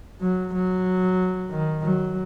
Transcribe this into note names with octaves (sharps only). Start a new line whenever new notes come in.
F#3
F#3
D#3
F#3